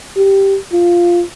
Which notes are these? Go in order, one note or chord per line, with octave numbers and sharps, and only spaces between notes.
G4
F4